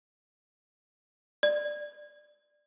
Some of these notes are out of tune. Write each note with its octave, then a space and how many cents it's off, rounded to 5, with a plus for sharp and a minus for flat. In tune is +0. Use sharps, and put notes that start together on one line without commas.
D5 +15